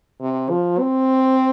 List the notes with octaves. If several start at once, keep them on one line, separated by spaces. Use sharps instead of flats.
C3
F3
C4